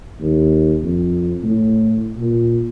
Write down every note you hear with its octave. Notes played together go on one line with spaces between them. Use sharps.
D#2
F2
A2
A#2